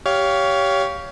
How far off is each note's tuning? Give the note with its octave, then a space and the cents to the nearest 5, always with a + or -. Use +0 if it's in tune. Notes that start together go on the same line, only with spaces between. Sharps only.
G4 +0 C#5 +20 F5 +0